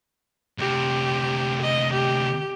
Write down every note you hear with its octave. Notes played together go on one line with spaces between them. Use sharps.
D2 C3 G4
D#5
G4